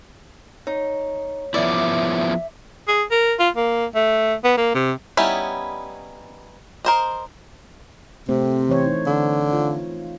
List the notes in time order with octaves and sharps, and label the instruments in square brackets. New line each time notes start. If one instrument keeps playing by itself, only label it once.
[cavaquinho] D#4 [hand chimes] C#5
[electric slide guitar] F3 B3 E4 [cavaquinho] D5 [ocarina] E5
[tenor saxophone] G#4
A#4
F4
A#3
A3
B3
A#3
C3
[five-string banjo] G3 B3 C#4 D#4 E4
A#4 C5 D#5
[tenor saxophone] C3 [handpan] A3 C4
[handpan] E3 C5 C#5
D#4
[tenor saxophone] D3
[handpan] F4